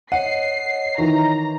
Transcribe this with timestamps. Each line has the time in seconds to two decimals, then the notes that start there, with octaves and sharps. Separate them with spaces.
0.12 C#5 D#5 F#5 C7
0.98 D#3 E3 A#5